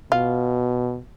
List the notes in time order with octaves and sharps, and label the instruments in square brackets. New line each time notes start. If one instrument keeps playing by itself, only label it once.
[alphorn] B2 [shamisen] F4